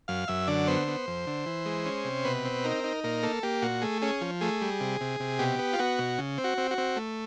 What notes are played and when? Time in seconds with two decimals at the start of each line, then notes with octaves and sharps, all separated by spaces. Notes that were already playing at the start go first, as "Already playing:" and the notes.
0.08 F#2 F5
0.28 F#2 E5
0.47 D3 D5
0.67 B3 C5
0.88 B3
1.08 F2
1.27 D3
1.46 E3
1.66 G#3
1.85 C#4
2.05 C3
2.25 B2 B4
2.45 C4
2.64 D#4 A#4
2.84 D#4
3.04 A#2 A#4
3.23 A#3 A4
3.43 A#3 G4
3.62 A#2 F#4
3.82 A3 G#4
4.02 C#4 G#4
4.21 F3
4.41 A3 G#4
4.61 G3
4.80 C3
5.01 C3
5.20 C3
5.39 B2 G4
5.59 B3
5.73 F4
5.79 B3 F#4
5.99 B2
6.18 C#3
6.38 C4
6.44 F#4
6.58 C4
6.71 F#4
6.78 C4
6.96 A3